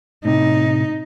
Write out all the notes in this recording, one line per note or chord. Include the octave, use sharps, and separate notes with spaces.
A2 C3 D#4